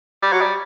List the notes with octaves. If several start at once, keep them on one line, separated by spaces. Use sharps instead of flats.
G3
F#3
G3